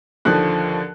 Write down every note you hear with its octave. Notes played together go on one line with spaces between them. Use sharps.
D#2 D3 F3 F#6